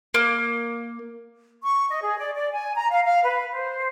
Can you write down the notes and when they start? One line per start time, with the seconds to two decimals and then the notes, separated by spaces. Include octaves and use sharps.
0.14 A#3
1.63 C#6
1.89 D#5
2.02 G#4
2.18 D5
2.35 D5
2.51 G#5
2.75 A#5
2.89 F5
3.04 F5
3.23 B4
3.53 C5